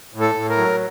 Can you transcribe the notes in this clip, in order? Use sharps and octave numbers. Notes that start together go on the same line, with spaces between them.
A2
A4
A2
A#4
F#3